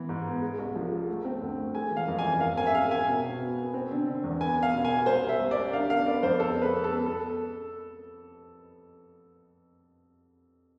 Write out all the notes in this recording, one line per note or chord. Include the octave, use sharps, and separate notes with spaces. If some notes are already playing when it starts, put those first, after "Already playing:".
Already playing: E3 B3
G#2
B3
G#3
C2
F3
G#3
A3
C4
D2
A3
G#3 G#5
E3
F5
F2
G#5
E3
G#2 F5
C4 G#5
E5
G#3 F5
C4 G#5
B2
B2
B3
B3
C4
D3
D3
E2
B3 G#5
B3
F5
B2
G#5
B3
C2 C5
C2
E5
C2
D5
C2
D3 F5
B3 F5
B3 D5
F2 C5
G#3 A4
B3 B4
G#3
A4
B3
A4